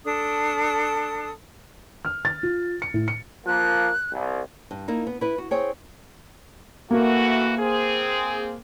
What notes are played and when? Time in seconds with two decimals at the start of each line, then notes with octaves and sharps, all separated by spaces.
0.05 D4 A4 D#6
2.05 F6
2.25 A6
2.43 F4
2.82 C#7
2.94 A2
3.08 C#7
3.47 F3 A#3 F#6
4.13 C2
4.71 G2
4.88 A#3 D#4 E4
5.07 B3
5.21 E4 B4
5.38 F#4
5.51 C4 G#4 C#5 G5
6.91 E3 A3 A#3 F#4
7.59 C4 G#4